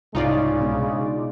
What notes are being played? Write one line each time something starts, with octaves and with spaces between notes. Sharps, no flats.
C2 G#2 C#3 G#3 D#4 F4 D5
B2 D4